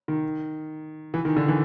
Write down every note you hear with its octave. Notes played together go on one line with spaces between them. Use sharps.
D#3
E3
D#3
D3
E3